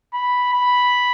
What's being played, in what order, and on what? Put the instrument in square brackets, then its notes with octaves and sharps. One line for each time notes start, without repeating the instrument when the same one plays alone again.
[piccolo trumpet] B5
B5